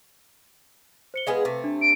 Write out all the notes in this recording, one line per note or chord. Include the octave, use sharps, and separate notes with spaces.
C5 C#7 G7
G#3 B3 G#4 B4 F5
C3 A3
D4
D7